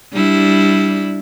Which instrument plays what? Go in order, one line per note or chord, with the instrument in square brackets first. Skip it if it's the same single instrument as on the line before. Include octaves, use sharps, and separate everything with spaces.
[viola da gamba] G3 D4 E4